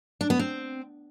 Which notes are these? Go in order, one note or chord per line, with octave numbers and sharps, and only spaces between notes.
D4
B3
C4